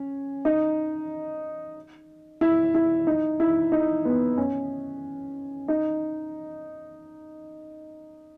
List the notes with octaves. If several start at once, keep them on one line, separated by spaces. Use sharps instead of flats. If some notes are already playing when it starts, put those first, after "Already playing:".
Already playing: C#4
D#4
E4
E4
D#4
E4
D#4
B3
C#4
D#4